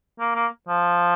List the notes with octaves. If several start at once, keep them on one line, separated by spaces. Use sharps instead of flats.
A#3
A#3
F3